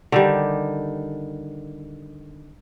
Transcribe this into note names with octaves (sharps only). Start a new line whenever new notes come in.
D3 D#3 G3